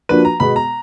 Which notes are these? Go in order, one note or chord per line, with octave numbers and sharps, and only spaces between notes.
F3 A#3 D4 F#4 B4
A#5
B2 G#3 B3 B5
A#5